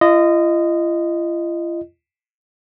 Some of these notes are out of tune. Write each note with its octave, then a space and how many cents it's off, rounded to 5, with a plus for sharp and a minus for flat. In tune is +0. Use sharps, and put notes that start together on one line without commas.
F4 -45 D#5 -10